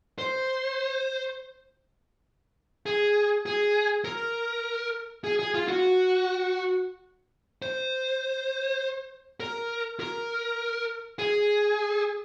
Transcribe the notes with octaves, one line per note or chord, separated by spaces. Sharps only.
C5
G#4
G#4
A#4
G#4
G#4
F4
F#4
C5
A#4
A#4
G#4